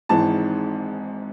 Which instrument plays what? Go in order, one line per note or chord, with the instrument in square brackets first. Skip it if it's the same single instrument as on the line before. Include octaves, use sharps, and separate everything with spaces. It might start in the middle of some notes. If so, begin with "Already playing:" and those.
[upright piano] G#1 G#2 E3 A5